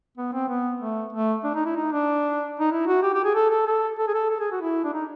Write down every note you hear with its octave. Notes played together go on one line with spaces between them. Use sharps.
B3
C4
B3
A3
A3
D4
D#4
E4
D#4
D4
D#4
E4
F#4
G4
G4
G#4
A4
A4
A4
A4
G#4
A4
A4
G#4
F#4
E4
D4
D#4